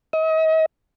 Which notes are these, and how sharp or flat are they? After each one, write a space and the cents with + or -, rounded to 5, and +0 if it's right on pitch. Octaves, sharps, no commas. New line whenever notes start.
D#5 +40